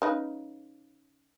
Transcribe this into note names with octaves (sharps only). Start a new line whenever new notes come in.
C#3 D#4 B4